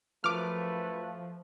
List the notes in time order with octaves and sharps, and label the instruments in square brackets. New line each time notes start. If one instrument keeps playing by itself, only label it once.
[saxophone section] F#2 B4 [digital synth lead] F3 [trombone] A3 [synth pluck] D6 F6